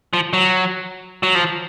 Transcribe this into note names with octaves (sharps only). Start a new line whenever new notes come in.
F3
F#3
F#3
F3